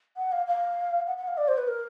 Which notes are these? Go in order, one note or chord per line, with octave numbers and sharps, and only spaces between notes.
F#5
F5
F5
F#5
F#5
F5
D5
C5
B4
A#4